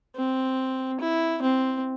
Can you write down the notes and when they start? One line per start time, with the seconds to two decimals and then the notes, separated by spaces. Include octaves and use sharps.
0.16 C4
1.01 E4
1.42 C4